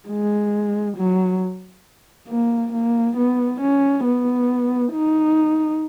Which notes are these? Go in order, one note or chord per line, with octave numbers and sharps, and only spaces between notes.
G#3
F#3
A#3
A#3
B3
C#4
B3
D#4